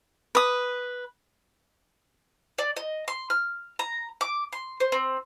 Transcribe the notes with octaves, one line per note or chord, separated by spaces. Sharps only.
B4 D#6
D5
D#5
C6
F6
A#5
D6
C6
C5
C4